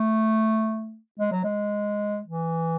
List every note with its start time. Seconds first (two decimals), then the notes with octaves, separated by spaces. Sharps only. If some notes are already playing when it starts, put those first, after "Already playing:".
Already playing: A3
1.20 G#3
1.32 F#3
1.44 G#3
2.27 E3